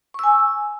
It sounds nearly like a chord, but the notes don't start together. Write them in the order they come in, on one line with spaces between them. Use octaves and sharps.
C#6 E6 G#5